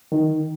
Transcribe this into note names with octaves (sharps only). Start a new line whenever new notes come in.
D#3